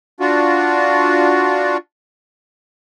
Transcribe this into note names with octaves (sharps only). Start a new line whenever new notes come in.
D4 F4 F#4